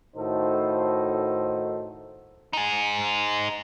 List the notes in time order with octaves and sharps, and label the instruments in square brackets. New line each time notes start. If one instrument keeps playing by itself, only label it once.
[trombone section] A2 D#3 D#4 F#4 A4 C5
[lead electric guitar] D#4 G#4